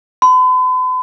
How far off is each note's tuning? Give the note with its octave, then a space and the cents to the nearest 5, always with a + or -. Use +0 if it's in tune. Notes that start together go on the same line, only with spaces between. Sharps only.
B5 +45